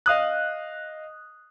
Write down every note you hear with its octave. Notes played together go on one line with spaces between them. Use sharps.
D#5 F5 D#6 F#6